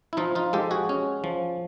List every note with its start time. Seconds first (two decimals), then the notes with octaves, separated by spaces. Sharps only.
0.13 E4
0.17 F3 D#4 F4
0.35 D#4 F4
0.53 G#3 G4 A4
0.71 F#4 G#4
0.89 C#4
1.24 F3